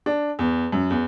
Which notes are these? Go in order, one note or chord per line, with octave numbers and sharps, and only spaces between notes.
D4
E2
F#2
E2